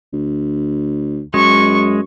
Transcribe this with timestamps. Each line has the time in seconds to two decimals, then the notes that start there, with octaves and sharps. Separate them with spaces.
0.13 D2
1.34 F#2 G#3 C#6